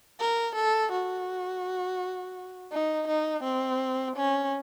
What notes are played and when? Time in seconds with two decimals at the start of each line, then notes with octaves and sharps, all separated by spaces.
0.20 A#4
0.56 A4
0.92 F#4
2.72 D#4
3.08 D#4
3.44 C4
4.16 C#4